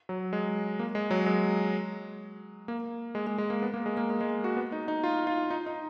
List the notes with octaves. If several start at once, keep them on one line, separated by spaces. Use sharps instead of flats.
F#3
G#3
A#3
G#3
F#3
G#3
A#3
G#3
G#3
G#3
A#3
B3
A#3
G#3
A#3
G#3
G#3
F#4
B3
D#4
D#4
F4
F4
D#4
D#4